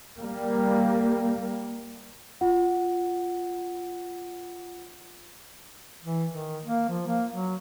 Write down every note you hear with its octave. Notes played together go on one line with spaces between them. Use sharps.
G3 A#3
F4 F#5
E3
D#3
A#3
F3
A#3
F#3